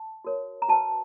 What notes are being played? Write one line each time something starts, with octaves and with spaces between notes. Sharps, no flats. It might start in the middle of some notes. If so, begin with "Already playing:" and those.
Already playing: A5
F#4 A#4 C#5
A#5
F#4 B4 A5